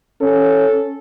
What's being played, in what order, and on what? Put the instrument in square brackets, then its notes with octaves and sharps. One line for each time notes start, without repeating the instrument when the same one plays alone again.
[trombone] C#4 [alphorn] A4